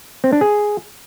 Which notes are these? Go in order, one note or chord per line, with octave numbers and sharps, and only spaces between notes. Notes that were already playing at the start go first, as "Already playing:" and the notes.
C4
D4
G#4